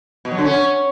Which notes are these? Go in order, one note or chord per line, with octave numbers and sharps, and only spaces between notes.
B2
F#3
D3
C#4